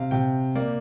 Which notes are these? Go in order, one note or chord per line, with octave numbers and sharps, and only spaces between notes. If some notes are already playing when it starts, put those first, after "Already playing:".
Already playing: C3 F5
C3 G5
A#3 D5